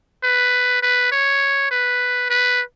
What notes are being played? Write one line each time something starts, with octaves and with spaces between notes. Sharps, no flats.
B4
B4
C#5
B4
B4